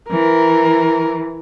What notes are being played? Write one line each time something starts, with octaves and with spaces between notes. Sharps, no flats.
E3 A#4